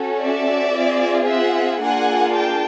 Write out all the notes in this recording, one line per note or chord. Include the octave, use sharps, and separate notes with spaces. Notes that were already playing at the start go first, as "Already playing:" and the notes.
Already playing: C#4 F#4 A4
D5 E5
C4 F4 G#4
E5 F#5
A#3 D4 F4 G#4 F#5 G#5
G5 A5